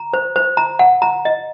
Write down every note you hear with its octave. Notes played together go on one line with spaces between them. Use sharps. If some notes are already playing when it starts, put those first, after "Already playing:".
Already playing: A#5
C5
C5
A#5
F#5
A#5
D#5